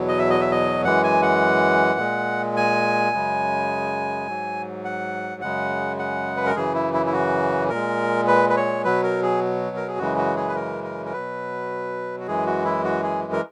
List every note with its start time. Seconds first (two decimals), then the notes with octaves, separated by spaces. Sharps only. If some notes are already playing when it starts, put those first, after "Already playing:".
Already playing: E2 B2 F#3
0.08 D#5
0.19 E5
0.30 D#5
0.41 E5
0.51 D#5
0.84 F#2 E3 G#3 F#5
1.04 G#5
1.22 F#5
1.99 A#2 G#3
2.57 G#5
3.13 F#2 C#3 G#3
4.28 G#2 F#3
4.85 F#5
5.41 F#2 C#3 G#3 F#5
5.99 F#5
6.36 B4
6.46 A#4
6.56 F#2 C#3 E3 G#4
6.75 E4
6.94 E4
7.06 E4
7.12 F#4
7.70 A#2 A#4
7.75 G#3
8.28 B4
8.50 B4
8.56 C#5
8.84 B2 F#3 B4
9.04 A#4
9.23 G#4
9.76 A#4
9.88 G#4
9.98 F#2 C#3 E3 G#3 F#4
10.18 F#4
10.37 G#4
10.49 B4
10.56 A#4
10.84 A#4
11.06 A#4
11.13 B2 F#3 B4
12.20 F#4
12.27 F#2 E3 G#3 G#4
12.47 F#4
12.65 E4
12.84 F#4
13.03 G#4
13.33 A#4